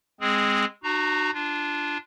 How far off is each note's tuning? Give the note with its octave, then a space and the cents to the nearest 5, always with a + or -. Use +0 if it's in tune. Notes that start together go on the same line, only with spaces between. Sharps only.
G#3 -10 C4 +0 G#4 +0
D4 +45 F#4 +0 A#5 -10
D4 +0 F4 -15